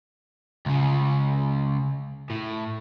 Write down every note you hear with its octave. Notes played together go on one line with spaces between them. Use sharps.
C#2 C#3
A2